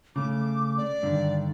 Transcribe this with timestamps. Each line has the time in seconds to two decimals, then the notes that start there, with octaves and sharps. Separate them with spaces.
0.16 C#3 A3 D6
0.77 D5
1.03 G2 D3 D#3